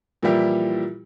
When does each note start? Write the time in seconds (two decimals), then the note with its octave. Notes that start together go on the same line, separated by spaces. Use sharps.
0.23 A#2 E3 F3 G3 E4 G4